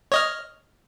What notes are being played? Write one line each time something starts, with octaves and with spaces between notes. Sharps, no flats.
C#5 D#5 F6